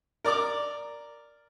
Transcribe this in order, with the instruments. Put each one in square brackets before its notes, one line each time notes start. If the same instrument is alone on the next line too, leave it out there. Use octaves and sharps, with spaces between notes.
[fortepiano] A#4 D5 A#5 D6